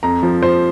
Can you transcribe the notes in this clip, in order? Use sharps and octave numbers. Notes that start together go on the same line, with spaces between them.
F2 A#5
F3
F3 C5